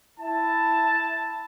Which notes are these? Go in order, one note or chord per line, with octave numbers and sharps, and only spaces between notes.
E4 A5